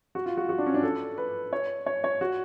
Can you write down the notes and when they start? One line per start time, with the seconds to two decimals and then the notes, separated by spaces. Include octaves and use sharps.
0.15 F#4
0.26 F4
0.37 F#4
0.49 F#4
0.58 D4
0.66 C#4
0.74 D4
0.83 A4
1.18 B4
1.53 C#5
1.86 C#5
2.04 C#5
2.21 F#4